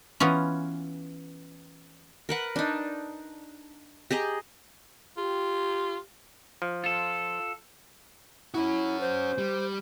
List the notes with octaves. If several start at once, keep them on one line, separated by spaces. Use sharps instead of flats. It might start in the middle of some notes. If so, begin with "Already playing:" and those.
E3 B3 C#4 F4
A#4 B4 F#5
D4 D#4
G4 G#4 D#5 A#5
F4 G4
F3
F4 A4
C#4 E4 F#4
C5
G3